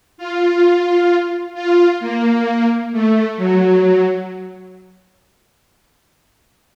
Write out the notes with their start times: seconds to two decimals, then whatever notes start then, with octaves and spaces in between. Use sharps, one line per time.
0.18 F4
1.54 F4
2.00 A#3
2.92 A3
3.37 F#3